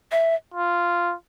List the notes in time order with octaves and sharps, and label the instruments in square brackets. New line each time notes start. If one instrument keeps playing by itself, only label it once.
[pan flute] E5
[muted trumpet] F4